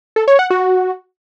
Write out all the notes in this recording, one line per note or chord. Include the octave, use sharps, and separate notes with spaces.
A4
C#5
F#5
F#4